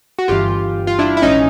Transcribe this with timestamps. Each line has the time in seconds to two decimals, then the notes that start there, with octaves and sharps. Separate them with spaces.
0.19 F#4
0.28 G1 G2 E3 F4 G4
0.87 F4
0.99 D4 E4
1.17 E4
1.22 A#1 G#2 E3 C#4 D#4